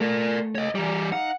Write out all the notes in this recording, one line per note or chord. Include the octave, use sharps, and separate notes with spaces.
A3 A#4 D5
C#5 D#5
E3 G3 D5 A#5
D#4 F5 F#5 A#5